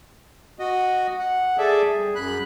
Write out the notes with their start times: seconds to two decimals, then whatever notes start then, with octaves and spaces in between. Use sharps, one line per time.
0.59 F#4 D#5
1.18 F#5
1.58 G#4 A4 D5 E5
1.93 G3
2.15 F#2 B5 F#6